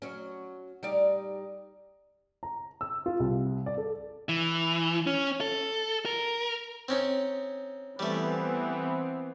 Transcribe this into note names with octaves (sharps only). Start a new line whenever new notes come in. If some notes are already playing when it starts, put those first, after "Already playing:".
F#3 C#4
G3 D#4 D5
A#5
E6
F4
C2
D5
A4
E3
C#4
A4
A#4
C4 C#4 D#4
E3 G3 A3 B3 C4